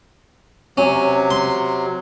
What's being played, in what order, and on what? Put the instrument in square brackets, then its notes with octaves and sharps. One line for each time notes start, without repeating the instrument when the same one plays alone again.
[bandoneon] C3 F#3 [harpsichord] C#4
[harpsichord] C6